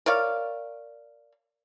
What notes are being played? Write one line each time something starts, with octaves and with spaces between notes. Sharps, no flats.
A#4 C#5 D5 F5